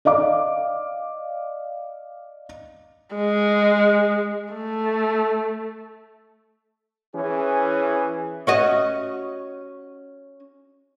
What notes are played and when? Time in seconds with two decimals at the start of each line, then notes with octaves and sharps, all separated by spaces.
0.05 D5 D#5 F5 D6
3.15 G#3
4.53 A3
7.16 E3 C#4 G#4
8.47 C#4 F#4 D#5